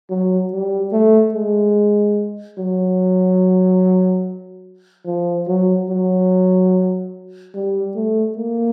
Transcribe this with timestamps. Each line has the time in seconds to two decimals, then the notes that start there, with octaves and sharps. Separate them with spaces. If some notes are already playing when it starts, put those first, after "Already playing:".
0.10 F#3
0.52 G3
0.93 A3
1.34 G#3
2.58 F#3
5.06 F3
5.47 F#3
5.89 F#3
7.55 G3
7.96 A3
8.37 A#3